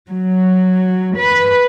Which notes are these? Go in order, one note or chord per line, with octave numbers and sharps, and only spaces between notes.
F#3
B4